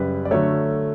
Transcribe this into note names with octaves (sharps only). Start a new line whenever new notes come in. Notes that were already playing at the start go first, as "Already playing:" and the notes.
Already playing: F#2 C#3 G3 B4
D5
D3 F#3 A3 C#5